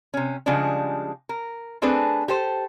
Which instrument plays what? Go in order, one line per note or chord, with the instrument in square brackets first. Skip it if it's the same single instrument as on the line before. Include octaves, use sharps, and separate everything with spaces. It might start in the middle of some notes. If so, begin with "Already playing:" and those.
[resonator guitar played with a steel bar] C3 C#4
C#3 F3 G3 G#3 D4
A#4
A3 C4 D4 G#4 A4 B4
G4 A4 C5